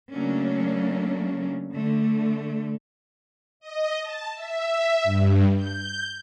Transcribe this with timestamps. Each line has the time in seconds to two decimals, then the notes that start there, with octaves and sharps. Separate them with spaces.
0.12 C#3 F#3 A3 A#3 C#4 D4
1.72 D3 A3
3.60 D#5
4.01 A5
4.34 E5
5.04 G2
5.55 G6